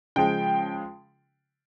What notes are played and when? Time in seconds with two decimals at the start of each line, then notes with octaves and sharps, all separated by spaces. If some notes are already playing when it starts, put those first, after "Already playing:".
0.16 C#3 F3 G#3 G5